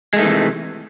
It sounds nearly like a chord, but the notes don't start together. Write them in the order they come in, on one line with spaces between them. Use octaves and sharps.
G#3 A3 D#3 E3 C3